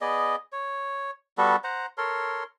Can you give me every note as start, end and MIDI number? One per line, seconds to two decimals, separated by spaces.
0.01 0.36 59
0.01 0.36 68
0.01 0.36 74
0.01 0.36 75
0.52 1.11 73
1.38 1.56 55
1.38 1.56 59
1.38 1.56 66
1.38 1.56 69
1.64 1.86 72
1.64 1.86 78
1.64 1.86 82
1.98 2.44 69
1.98 2.44 70
1.98 2.44 73
1.98 2.44 84